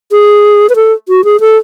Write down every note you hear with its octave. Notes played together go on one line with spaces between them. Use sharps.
G#4
B4
A4
F#4
G#4
A4